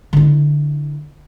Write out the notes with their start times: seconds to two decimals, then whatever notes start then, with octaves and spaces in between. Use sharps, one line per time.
0.13 D3 E4